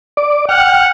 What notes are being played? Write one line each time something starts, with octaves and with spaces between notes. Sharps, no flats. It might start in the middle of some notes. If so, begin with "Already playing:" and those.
D5 D6
F#5 G5 F6